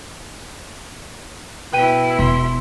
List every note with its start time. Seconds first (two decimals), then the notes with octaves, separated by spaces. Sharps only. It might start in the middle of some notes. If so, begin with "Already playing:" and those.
1.72 B2 E4 B4 G5 D#7
2.19 E1 C6